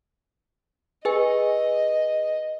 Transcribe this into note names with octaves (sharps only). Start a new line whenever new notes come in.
G#4 B4 D#5 G#5